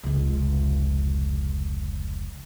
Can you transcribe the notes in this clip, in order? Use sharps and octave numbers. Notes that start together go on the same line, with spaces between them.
F1 C#2